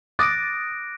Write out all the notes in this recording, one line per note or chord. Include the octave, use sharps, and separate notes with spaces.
D6 D#6 F#6 A6 A#6 D7